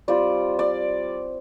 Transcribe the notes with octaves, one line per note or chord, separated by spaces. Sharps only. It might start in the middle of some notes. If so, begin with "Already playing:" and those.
G3 C4 F4 D5
D5